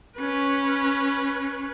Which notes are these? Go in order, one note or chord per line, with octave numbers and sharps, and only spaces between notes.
C#4 B4